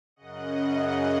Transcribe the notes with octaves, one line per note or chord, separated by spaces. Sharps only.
F#2 C#3 D#5 F#5
D#5 F#5